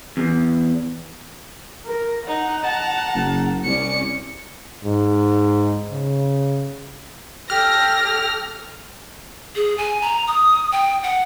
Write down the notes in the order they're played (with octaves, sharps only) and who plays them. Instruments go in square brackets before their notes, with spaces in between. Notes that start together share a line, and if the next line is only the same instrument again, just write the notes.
[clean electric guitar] E2
[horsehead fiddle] A#4
[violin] D#4 [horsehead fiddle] F#5
[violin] A5 A#5
[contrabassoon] F#1
[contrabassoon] C2 [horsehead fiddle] C#4 D5 [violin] C#7
[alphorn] G#2
C#3
[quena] G4 [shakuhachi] A4 [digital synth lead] F6 [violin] A#6
[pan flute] G#4
G#5
A#5
D#6
G5
F#5